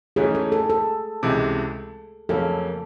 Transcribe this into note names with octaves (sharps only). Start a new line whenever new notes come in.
G#2 E3 A3 C#4 G#4
A4
A4
A4
C#2 C3 E3 G#3
F2 C#3 F#3 A#3 C#4 A4